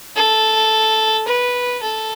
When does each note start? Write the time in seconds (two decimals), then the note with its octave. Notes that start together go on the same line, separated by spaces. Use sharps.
0.16 A4
1.28 B4
1.83 A4